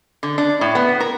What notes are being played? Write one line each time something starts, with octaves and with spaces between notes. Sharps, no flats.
D3
D4
A2
B3
A#4